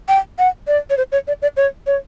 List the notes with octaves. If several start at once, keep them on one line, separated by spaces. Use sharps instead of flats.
G5
F#5
D5
C#5
C5
C#5
D5
D5
C#5
C#5